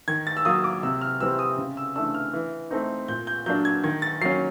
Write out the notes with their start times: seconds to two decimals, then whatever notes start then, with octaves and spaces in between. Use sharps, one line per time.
0.08 D#3 G#6
0.27 A6
0.37 E6
0.45 F#3 A#3 D#6
0.64 D6
0.83 C3 E6
1.01 F6
1.20 E3 G3 C4 E6
1.39 D#6
1.58 C#3
1.77 E6
1.96 E3 A3 D4 E6
2.14 F6
2.33 E3
2.71 A3 C4 D#4
3.08 A#2 G6
3.27 G6
3.46 F#3 A#3 D4 G6
3.65 G#6
3.83 D#3 G#6
4.02 A6
4.21 F#3 A#3 C#4 C7